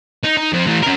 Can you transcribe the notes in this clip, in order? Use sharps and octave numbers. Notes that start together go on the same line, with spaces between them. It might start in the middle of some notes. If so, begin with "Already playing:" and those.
D#4
D#4
F2 C4
E3 A3
C#4 A#4